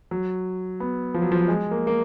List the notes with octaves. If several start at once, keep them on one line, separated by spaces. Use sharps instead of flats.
F#3
B3
F3
F#3
F3
G#3
A#3
A#3